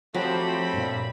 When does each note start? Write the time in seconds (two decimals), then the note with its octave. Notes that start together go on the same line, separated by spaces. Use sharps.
0.14 F3 F#3 A3 C4 G4 C5 B5
0.73 G2 A#2